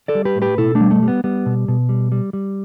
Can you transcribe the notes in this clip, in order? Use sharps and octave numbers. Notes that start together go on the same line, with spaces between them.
A4 D5
G3
G4 B4
A2
G4 B4
B2 E4 A4
A3 D4
G3
A3
G3
B3
G3 B3
B2
B2
G3
G3
G3